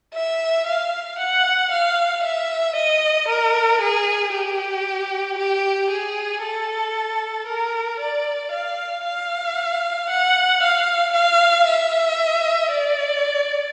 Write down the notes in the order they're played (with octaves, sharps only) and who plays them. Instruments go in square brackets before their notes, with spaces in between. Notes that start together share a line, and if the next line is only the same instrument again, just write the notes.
[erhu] E5
F5
F#5
F5
E5
D#5
A#4
G#4
G4
G4
G#4
A4
A#4
D5
F5
F5
F#5
F5
F5
E5
D5